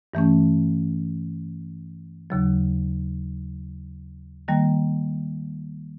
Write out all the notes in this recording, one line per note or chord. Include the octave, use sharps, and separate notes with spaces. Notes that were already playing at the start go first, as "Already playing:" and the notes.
G2 E3 A3 C#4
D#2 C#3 F#3
D#3 G3 A#3